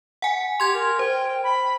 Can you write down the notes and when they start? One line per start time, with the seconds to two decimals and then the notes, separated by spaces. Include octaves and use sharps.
0.22 F#5 G#5
0.60 G4 C6 G#6
0.73 A#4
0.99 C5 G5
1.43 B5